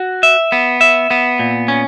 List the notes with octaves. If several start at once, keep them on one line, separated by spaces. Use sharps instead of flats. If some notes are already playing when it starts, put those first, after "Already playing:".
Already playing: F#4
E5
B3
E5
B3
A#2
C#4